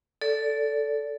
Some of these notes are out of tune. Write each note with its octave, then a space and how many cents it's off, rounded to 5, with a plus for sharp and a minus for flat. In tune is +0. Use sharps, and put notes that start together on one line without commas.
A4 +0 D5 -25